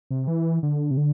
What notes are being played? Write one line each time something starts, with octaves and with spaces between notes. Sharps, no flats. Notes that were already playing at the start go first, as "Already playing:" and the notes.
C3
E3
D3
C3
D3